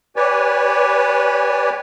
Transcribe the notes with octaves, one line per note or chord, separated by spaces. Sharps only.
G4 B4 C#5 D5 G#5